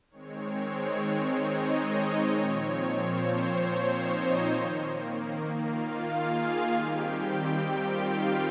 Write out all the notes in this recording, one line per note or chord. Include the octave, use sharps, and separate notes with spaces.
D#3 G#3 C4 C#5
D#4 D#5
A#2 F3 C4 C#5
C5
C#5
D#4 D#5
D#3 A#3
F4 F5
G#4 G#5
D#3 G3 C4 G4 G5
G4 G5
F4 F5